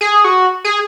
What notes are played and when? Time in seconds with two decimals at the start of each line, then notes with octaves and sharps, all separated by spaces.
0.01 G#4
0.24 F#4
0.65 G#4